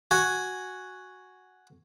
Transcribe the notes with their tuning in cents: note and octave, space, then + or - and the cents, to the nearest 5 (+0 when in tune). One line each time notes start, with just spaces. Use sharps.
F#4 +0 G#5 +0